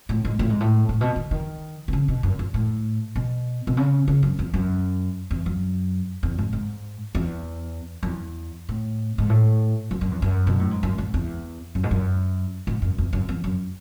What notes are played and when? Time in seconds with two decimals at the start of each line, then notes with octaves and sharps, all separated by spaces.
0.09 A2
0.25 G#2
0.39 A2
0.49 G#2
0.60 A2
0.89 A2
1.01 B2
1.16 D#3
1.31 D#3
1.88 B2
1.93 C#3
2.08 B2
2.23 F#2
2.39 E2
2.54 A2
3.16 B2
3.67 B2
3.77 C#3
4.08 C#3
4.23 F#2
4.39 E2
4.54 F#2
5.31 E2
5.46 F#2
6.23 E2
6.38 G#2
6.53 G#2
7.15 E2
8.03 F#2
8.06 E2
8.69 A2
9.18 G#2
9.29 A2
9.91 F#2
10.01 F#2
10.11 E2
10.22 F#2
10.47 B2
10.59 A2
10.71 G#2
10.83 F#2
10.98 G#2
11.14 E2
11.75 F#2
11.83 G#2
11.91 F#2
12.67 G#2
12.82 F#2
12.98 E2
13.13 F#2
13.29 E2
13.44 F#2